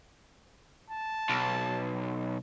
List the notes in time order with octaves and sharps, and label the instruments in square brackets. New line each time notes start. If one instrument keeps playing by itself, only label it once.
[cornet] A5
[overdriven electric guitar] B1